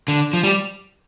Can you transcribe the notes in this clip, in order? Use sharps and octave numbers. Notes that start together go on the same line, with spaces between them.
D3
F3
G3